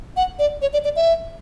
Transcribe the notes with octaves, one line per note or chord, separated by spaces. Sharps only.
F#5
D5
C#5
D5
D5
E5